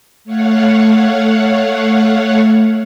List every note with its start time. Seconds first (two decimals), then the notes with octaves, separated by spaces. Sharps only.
0.24 A3 C#5 F5 F#5